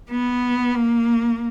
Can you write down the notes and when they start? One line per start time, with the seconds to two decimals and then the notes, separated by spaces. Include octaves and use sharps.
0.11 B3
0.75 A#3